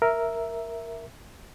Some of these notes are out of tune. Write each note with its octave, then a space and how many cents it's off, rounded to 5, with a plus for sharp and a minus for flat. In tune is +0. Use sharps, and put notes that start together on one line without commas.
A#4 +0 E5 +0